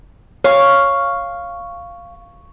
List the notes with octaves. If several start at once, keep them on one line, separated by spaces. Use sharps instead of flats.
C#5 F5 C#6